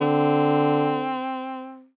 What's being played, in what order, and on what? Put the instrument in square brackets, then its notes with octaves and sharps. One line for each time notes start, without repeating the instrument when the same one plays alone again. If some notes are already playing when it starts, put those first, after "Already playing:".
[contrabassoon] D3 [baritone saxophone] C4